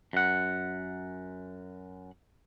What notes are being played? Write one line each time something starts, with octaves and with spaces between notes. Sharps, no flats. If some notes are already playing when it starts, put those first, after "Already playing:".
F#2 F#5